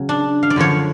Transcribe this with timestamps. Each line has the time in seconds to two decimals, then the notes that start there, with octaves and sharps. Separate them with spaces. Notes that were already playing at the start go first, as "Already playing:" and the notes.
Already playing: C#3 F#3
0.09 D4
0.43 F5
0.50 D5
0.56 F#2 D3 F3 C#5